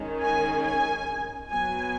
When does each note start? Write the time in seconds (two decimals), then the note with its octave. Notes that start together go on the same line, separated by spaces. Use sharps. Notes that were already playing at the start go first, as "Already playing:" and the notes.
Already playing: D#3 G#3 C#4
0.20 G#5
0.63 G#5
1.50 F#3 B3 G#5